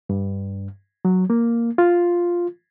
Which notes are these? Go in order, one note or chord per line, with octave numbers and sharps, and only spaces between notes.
G2
F#3
A#3
F4